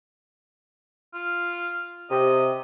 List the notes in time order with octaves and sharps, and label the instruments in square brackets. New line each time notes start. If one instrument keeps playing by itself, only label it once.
[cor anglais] F4
[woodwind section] C3 [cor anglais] D#5